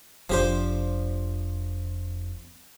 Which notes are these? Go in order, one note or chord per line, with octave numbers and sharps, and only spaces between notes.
F1 F3 C4 D4 G4 C5